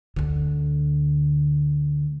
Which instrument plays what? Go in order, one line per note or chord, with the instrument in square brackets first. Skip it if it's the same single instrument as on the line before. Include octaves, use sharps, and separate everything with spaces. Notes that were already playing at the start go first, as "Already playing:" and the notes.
[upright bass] D2 D3